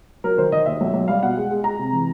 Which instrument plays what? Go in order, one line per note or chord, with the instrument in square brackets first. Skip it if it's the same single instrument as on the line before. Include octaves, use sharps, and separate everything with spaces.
[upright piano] F#3 A#4
D#3 C5
D#3 D#5
D#2 E5
B1
B1
G3 F5
B2 F#5
G#3
G#3
G#3 A#5
C3
E3